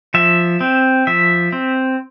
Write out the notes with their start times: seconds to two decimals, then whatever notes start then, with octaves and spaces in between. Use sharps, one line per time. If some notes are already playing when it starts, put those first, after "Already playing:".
0.14 F3 E5
0.61 C4
1.07 F3 E5
1.53 C4